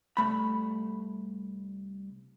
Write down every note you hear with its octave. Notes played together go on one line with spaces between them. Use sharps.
C2 A3 B5